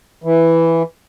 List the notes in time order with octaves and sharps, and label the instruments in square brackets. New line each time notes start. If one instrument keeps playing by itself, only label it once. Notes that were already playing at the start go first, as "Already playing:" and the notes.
[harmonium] E3